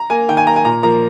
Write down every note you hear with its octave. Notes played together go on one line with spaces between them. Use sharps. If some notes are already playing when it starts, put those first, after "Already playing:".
Already playing: A#5
A#3 G#5
D#3 G5
G#5
A#3 A#5
G#5
A#2 A#5
F3 A#3 A#5